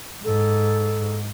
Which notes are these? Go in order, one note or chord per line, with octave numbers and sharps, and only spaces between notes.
G#2 A4